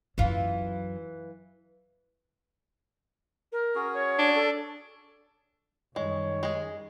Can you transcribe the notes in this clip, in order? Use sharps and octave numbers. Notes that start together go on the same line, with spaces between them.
F#2 E3 F#3 F4
A#4
C#4 F#4 G#4
C#5
D4
A4
F#2 D#3 G3 G#3 C#5
G#3 G#4